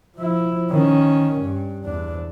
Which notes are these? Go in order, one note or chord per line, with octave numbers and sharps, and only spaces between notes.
F3 E4
D#3 C#4
G2
E2 D4